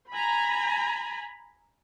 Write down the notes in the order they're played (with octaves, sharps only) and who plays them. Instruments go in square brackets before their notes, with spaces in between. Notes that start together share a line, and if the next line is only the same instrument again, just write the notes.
[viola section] G#5 A#5 B5